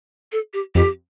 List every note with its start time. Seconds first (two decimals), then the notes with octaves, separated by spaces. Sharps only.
0.32 A4
0.53 G4
0.75 F2 G4